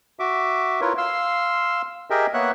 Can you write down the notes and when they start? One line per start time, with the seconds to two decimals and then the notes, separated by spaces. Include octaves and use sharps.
0.20 F#4 E5 D6
0.81 E4 F4 A#4 B4 C#5
0.98 F5 C6 E6
2.10 G4 G#4 A#4 D#5 E5 G5
2.34 A#3 B3 C#5 E5 F#5 F#6